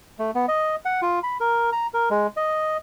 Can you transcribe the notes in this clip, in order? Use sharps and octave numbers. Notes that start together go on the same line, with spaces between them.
A3
B3
D#5
F#5
F4
B5
A#4
A#5
A#4
G#3
D#5